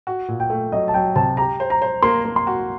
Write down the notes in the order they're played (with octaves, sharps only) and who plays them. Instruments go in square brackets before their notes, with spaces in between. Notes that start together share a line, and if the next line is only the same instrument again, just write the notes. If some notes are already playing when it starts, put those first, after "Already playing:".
[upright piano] F#4
A#2
[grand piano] G5
[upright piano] A3
[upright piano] F#3 [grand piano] D#5
[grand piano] A5
[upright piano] F#3 [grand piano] G5
[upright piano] C3 [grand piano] A5
[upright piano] G4 [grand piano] A#5
[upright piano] C5
[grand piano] A#5
[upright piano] C5
[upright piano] A#3 [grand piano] C6
[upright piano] A#3
[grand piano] C6
[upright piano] F#4